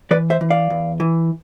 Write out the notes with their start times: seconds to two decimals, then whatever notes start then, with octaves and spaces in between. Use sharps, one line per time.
0.11 E3 B4 D5
0.30 C5 E5
0.41 E3
0.50 D5 F5
0.70 E2
1.00 E3